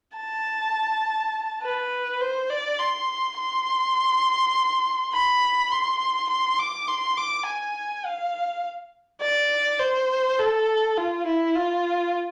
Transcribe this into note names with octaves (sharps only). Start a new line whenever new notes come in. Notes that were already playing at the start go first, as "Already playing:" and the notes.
A5
B4
C5
D5
C6
C6
B5
C6
C6
D6
C6
D6
G#5
F5
D5
C5
A4
F4
E4
F4